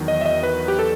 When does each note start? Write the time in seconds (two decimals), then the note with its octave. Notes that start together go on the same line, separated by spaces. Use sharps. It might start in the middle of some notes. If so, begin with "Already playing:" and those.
Already playing: E2 D#3 F#3
0.08 D#5
0.21 E5
0.26 D#5
0.43 B4
0.68 G4
0.79 A4